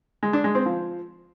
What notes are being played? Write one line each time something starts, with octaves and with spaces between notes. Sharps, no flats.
G#3
D4
G#3
C4
F3